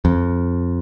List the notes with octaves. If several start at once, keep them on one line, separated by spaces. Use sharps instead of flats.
F2